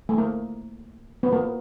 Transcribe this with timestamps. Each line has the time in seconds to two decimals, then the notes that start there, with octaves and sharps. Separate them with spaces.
0.09 A3
0.18 A#3
1.23 B3
1.33 A#3